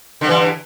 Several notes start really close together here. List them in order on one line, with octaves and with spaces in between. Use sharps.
D3 G2 E3